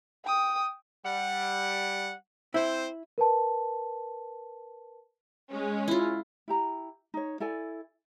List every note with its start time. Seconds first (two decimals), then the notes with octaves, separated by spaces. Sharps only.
0.25 G5 D#6
1.04 G3 F#5
2.54 C4 E4 C5 E5
3.18 A#4 B4 A5
5.49 G#3 C#4
5.88 E4 F4
6.48 E4 G4 A#5
7.14 D#4 C#5
7.40 E4 A4 D5 G#5